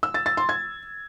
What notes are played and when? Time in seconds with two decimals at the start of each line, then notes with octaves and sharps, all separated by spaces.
0.03 E6
0.14 A6
0.26 A6
0.37 C6
0.49 G#6